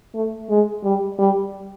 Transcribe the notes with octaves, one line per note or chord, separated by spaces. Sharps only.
A3
G#3
G3
G3